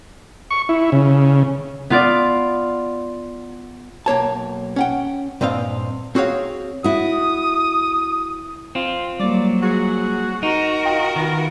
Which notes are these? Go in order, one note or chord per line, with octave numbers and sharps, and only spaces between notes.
C#6
E4
C#3
B3 F4 D5
B1 A#3 C#5 A5
C#4 F#5 G5
G2 A#2 C4 D#5 F5
C4 F#4 G#4 C#5 F5
E4 F#4 D#6
C4 F4
F#3 G3 A#3 D5
F#4 G#4
D#4 F#4 A#4
F4 D#5 G5
D#3 B3 E4 F4